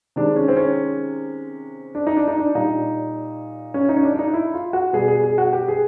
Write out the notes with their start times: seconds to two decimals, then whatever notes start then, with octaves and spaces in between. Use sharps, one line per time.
0.16 C3 D#3 G#3 D4
0.36 C#4
0.48 C4
0.57 C#4
1.95 D4
2.07 D#4
2.17 D4
2.28 D#4
2.39 D4
2.55 A#2 G3 D#4
3.74 C#4
3.89 D#4
3.96 C#4
4.03 D4
4.14 D4
4.19 D#4
4.34 E4
4.54 F4
4.73 F#4
4.93 B2 G3 G#4
5.08 G#4
5.24 G#4
5.38 F#4
5.53 G4
5.68 G#4